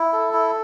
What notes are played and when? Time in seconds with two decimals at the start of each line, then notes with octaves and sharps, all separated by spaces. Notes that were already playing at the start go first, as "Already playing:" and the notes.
Already playing: E4
0.13 A4
0.33 E4